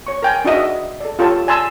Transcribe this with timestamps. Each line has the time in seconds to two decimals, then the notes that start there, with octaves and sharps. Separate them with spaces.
0.07 C#5 C#6
0.22 A#4 G5 G#5
0.45 D4 D#4 F#4 C5 D#5 E5
1.00 A4 D5
1.19 F4 G4 A4 C#5 A5
1.47 D5 G#5 A5 C6 E6